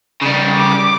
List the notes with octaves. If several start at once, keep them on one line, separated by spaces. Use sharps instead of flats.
C#3 G3
D6